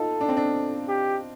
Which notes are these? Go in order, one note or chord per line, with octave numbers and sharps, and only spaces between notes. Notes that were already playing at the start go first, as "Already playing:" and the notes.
Already playing: D#4 F4 A4
D4
C4
D4
G4